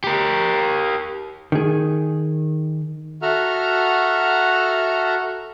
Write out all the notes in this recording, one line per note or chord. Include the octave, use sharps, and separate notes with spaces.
G4 A#4
D#3 G#4
F#4 A4 E5 F#5 A#5 F6